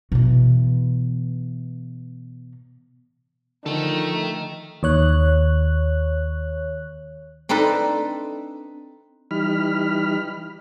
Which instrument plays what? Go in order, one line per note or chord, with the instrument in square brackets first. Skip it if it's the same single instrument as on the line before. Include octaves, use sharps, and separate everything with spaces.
[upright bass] B2 E3
[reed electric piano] D3 F3 [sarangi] D#3 [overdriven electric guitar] A3 A4
[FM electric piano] D#2 C#5 F#6
[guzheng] C4 D4 D#4 A4 B4
[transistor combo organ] E3 G3 D#4 B5 F6